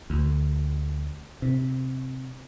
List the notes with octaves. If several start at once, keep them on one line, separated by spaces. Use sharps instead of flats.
D2
C3